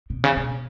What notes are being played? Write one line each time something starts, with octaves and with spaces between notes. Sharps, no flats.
B2
C#3
B2